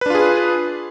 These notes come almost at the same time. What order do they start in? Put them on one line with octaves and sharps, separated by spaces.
B4 D4 F4 G#4